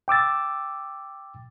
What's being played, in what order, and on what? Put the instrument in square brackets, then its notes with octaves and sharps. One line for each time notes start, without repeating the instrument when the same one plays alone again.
[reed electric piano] G5 D6 E6 A6